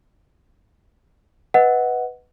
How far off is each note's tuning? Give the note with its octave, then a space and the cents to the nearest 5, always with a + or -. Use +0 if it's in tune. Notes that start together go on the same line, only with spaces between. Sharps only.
B4 +0 D#5 +30 F#5 +0